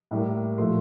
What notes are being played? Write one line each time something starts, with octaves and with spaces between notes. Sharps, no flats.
A2 G3 A#3
A#2 F3 A3 C6